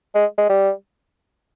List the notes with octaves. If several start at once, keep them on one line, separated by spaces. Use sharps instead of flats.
G#3
G#3
G3